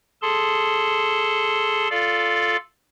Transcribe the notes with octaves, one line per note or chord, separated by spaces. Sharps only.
G#4 A4 A5 C6
F4 A4 D5 F5